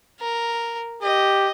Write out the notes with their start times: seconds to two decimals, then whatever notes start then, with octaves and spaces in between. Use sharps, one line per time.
0.20 A#4
1.03 G4 D#5